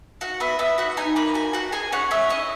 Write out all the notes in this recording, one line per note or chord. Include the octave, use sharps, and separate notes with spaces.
F#4 F#5
B3 E5
B3 E5
F#4 F#5
D#4 G#5
A#3 B5
F#4 G#5
F#4 F#5
G#4 G#5
C#4 F#5
C#4 E5
E4 D#5